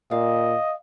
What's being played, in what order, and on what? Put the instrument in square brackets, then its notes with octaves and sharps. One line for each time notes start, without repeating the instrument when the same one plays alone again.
[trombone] A#2 [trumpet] D#5 [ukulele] F5